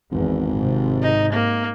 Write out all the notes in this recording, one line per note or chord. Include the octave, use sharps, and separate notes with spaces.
G#1 E2
G#2 C3
D#4
A#3